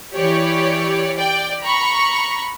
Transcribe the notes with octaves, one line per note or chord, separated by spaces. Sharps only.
E3 G4 C#5 D5
D5 G5
A#5 B5 C#6